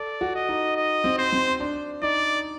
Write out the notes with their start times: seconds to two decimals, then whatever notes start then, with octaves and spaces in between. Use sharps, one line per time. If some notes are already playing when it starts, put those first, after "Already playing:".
Already playing: A4 D5
0.21 F#4
0.35 D#5
0.49 D#4
0.76 D#5
1.04 C4
1.18 C5
1.33 C4
1.60 D4
2.02 D#4 D5